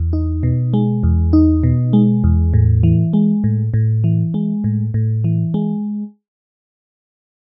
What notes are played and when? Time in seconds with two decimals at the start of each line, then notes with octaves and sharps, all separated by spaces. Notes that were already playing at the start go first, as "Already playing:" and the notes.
Already playing: E2
0.13 D#4
0.43 B2
0.74 G#3
1.03 E2
1.33 D#4
1.63 B2
1.93 G#3
2.24 E2
2.54 A2
2.83 E3
3.13 G#3
3.44 A2
3.74 A2
4.04 E3
4.34 G#3
4.64 A2
4.94 A2
5.24 E3
5.54 G#3